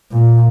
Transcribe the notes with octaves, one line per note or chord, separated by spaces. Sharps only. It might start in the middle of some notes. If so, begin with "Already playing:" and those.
A#2